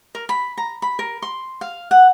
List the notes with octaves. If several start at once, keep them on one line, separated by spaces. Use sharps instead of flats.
A#4
B5
A#5
B5
A#4
C6
F5
F#5